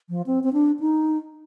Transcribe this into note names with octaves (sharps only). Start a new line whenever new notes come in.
F3
C4
C4
D4
D#4